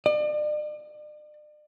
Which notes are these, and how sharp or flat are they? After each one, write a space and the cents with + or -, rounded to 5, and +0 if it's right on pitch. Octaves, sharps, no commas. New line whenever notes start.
D5 +40